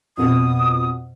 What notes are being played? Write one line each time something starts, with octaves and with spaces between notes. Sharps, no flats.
F2 B2 D#6